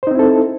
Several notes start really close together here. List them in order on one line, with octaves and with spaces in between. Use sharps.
C5 D#4 C4 E4 A4